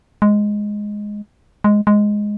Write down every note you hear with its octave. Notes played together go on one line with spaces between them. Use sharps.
G#3
G#3
G#3